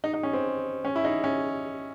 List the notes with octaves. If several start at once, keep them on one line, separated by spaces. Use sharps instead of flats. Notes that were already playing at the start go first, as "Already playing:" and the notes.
D#4
D#4
C#4
C4
C#4
E4
D#4
C#4